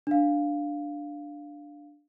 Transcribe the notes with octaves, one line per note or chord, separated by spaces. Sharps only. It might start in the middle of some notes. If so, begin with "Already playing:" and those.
D4 F5